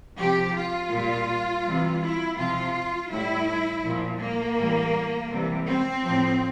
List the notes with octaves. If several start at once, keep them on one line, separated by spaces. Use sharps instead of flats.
C3 F3 G4
F4
A#2 G3
C3 E3 G3
E4
C3 F3 F4
A2 G3 E4
A#2 F3
A#3
A2 E3 G3
C3 E3 G3
C4
F3
A2